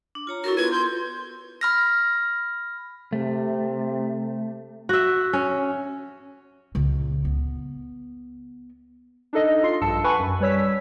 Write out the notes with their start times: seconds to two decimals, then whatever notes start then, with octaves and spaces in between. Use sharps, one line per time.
0.15 D4
0.27 F4 C#5 A#5
0.44 E4 F#4 A4 A#4
0.57 B3 F4 B4 G#6
0.72 C6 G6
1.61 B5 F6 A#6
3.13 C3 A3
4.89 F#4 E5
5.33 C#4
6.75 C#2 A#2
7.25 B3
9.33 D4 D#4 A4 D#5
9.63 F4 C6 C7
9.81 A#1 G2 A5 E6 C#7
10.04 B4 F#5 G#5 A5 B5 C#6
10.20 F#2
10.40 G3 B4 C#5 E6 B6